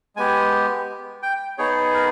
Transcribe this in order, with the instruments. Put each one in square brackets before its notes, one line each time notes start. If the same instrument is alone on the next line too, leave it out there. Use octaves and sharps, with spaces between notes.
[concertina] G#3 B3 G4 G#5
G5
B3 D#4 G#4 C#5
A#4